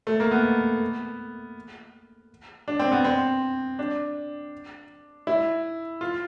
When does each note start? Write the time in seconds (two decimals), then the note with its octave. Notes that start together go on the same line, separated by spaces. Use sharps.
0.07 A3
0.20 A#3
0.31 B3
2.68 D4
2.79 C4
2.92 B3
3.04 C4
3.79 D4
5.27 E4
6.01 F4